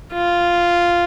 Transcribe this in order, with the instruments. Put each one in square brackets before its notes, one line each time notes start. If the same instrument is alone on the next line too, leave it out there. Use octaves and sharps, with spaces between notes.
[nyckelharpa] F4